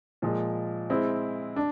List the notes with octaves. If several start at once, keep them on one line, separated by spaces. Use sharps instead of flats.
A#2 F3 G#3
G#3 C4 E4
D4